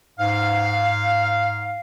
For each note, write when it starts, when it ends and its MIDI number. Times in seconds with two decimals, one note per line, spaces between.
0.19 1.81 44
0.19 1.81 77